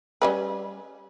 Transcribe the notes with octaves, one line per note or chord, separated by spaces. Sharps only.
G3 C#4 B4